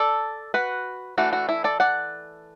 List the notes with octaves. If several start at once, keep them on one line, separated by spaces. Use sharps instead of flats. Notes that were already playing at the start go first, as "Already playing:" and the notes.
Already playing: A4 D5
F#4 B4
E3 A3 D4 F#4
F#4
E4
A4 D5
D5 F#5